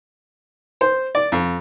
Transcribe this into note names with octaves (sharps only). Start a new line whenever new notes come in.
C5
D5
F2